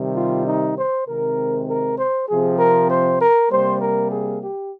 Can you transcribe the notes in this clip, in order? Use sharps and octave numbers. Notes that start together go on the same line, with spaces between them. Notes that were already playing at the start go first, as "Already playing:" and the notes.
Already playing: C3 D#3 G3
F4
D#4
C5
C3 D#3 G#3 C4 A#4
A#4
C5
C3 F3 C4 G#4
A#4
C5
A#4
C3 G3 A#3 C5
A#4
G#4
G4